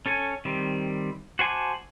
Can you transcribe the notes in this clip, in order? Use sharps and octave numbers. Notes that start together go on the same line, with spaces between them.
C#4 A4 C#5 G#5
D#3 G3 C4
F#4 C5 G#5 A5 D6